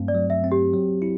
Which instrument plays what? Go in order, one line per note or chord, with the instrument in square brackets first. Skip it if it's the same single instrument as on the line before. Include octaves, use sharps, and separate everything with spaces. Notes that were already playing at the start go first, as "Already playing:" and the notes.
Already playing: [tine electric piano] G2 F#3 A3 C4
[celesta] D5
[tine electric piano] F#3
[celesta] E5
[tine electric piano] C4
[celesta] G4
[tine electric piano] F#3
E4